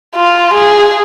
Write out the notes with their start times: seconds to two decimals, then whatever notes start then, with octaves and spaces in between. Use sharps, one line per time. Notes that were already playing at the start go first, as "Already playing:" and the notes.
0.15 F4
0.54 G#4